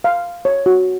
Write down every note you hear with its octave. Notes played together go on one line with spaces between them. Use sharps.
F5
C#5
F#4